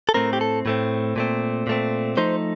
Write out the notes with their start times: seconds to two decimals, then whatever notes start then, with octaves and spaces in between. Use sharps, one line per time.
0.09 A4
0.14 A2 A3 C4 A#4
0.33 G4
0.41 A4
0.66 A2 A3 C4
1.16 A#2 A3 C4
1.67 A#2 A3 C4
2.17 F3 A3 D#4 C5